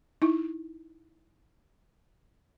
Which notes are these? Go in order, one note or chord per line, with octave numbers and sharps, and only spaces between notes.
D#4 E4